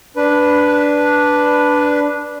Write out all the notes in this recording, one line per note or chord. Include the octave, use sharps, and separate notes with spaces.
D4 B4